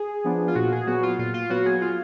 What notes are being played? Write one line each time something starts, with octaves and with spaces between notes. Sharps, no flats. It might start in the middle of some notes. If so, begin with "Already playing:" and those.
Already playing: G#4
F3 B3 D4
F4
A#2 F#4
G#4
F#3 B3 F#4
F4
A#2 F4
F4
F#3 B3 F#4
G#4
F4